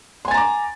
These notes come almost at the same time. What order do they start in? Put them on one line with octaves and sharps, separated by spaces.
C6 G#5 A6 A#5 D6